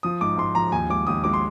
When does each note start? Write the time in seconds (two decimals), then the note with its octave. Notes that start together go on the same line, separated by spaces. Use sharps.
0.03 F3 D#6
0.21 G#2 D6
0.38 G#2 C6
0.55 F3 A#5
0.72 D#2 G#5
0.90 G#3 D6
1.07 D#2 D#6
1.24 G#3 D6
1.34 C6